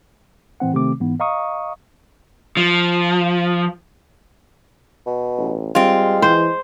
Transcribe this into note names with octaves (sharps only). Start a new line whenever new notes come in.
A2 E3 C4 F#5
C3 D#3 A3 C4 D6
G#2 E3 B3
D#5 F5 A#5 C#6 D#6
F3
B2
A1
G3 G#3 C4 F4
E3 C5